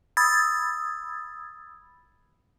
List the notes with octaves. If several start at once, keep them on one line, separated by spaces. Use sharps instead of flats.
B5 D#6 E6 G#6 A6